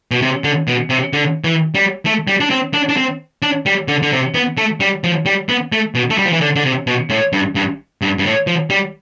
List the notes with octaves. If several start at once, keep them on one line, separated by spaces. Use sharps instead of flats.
B2
C3
D3
B2
C3
D3
E3
G3
A3
G3
D4
C4
D4
D4
C4
D4
G3
D3
D3
C3
B3
A3
G3
F3
G3
B3
A3
B2
A3
G3
F3
E3
D3
D3
C3
B2
A2
G2
G2
G2
G2
A2
F3
G3